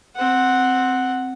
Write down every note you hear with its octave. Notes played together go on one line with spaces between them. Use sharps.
C4 F#5